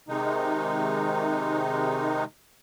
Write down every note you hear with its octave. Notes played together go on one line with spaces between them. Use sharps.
C3 D#3 G#3 D#4